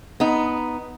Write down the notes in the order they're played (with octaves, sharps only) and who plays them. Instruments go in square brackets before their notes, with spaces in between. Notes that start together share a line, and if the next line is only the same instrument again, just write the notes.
[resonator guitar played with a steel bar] B3 D#4